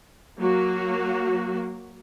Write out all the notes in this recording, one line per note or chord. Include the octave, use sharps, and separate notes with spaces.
F#3 A#3 F#4